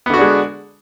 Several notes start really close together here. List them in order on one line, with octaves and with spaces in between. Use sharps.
B3 D3 F#4 D4 G#3